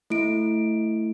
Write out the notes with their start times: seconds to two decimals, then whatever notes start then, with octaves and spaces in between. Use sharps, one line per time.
0.10 A3 E4 D7